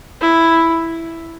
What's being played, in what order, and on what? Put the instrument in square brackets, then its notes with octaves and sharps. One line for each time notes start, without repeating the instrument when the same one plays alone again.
[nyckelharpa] E4